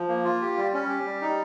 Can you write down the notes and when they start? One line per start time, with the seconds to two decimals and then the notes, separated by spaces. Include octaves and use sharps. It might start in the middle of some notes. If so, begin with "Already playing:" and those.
Already playing: F3
0.08 A#3
0.24 F4
0.41 G4
0.57 G3
0.74 C#4
0.89 G4
1.06 G3
1.22 D#4